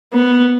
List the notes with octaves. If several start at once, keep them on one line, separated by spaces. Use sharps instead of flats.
B3